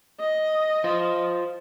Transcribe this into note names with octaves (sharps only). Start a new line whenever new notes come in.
D#5
F4 C5